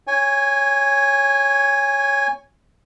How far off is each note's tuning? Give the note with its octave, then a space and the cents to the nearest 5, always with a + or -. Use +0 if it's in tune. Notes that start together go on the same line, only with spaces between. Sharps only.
C#5 +0 G#5 -20